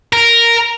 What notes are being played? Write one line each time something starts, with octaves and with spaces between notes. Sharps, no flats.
A#4